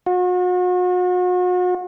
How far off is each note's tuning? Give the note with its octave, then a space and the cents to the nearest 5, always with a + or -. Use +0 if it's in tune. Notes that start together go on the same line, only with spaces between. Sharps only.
F#4 -40